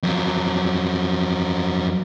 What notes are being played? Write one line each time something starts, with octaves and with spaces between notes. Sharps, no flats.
F2 F#3